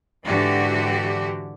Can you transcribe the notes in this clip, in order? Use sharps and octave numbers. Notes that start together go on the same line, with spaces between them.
G#2 D3 E3 D4 F#4 G4